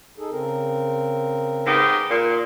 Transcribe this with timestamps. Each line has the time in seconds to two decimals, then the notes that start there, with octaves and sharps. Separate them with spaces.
0.18 D#4 G#4 A4
0.30 C#3 C4 A#4
1.66 G#2 B3 G4
2.10 A#2